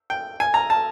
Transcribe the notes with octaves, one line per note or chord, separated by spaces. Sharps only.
G5
G#5
A#5
A5